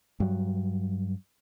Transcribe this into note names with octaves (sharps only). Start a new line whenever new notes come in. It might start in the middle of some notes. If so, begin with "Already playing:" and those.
G2 F#3